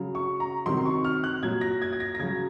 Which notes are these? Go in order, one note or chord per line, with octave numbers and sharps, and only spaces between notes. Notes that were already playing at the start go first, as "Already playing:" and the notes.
Already playing: C#3 F#3
C#6
A#5
C3 D#3 F#3 C6
C#6
F6
F#6
A#2 F#3 G#6
A#6
G#6
G#6
A#6
A#6
C#3 F#3 G#6